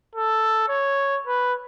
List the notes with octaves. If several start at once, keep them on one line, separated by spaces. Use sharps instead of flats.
A4
C#5
B4